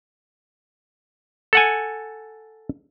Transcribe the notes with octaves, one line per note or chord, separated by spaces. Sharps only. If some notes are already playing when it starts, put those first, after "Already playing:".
A4 F#5 G#5